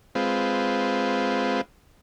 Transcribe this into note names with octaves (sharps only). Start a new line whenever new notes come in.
G#3 C4 F4 B4